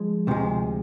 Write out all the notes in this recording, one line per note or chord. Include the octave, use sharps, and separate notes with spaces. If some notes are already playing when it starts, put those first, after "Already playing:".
Already playing: F3 G#3
D2 C3 F3 G#3